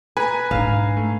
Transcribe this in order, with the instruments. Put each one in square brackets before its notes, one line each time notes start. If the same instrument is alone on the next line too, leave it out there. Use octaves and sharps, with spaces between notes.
[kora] B4 [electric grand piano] G#5 A#5
[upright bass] G#2 D4 [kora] F5
[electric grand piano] A3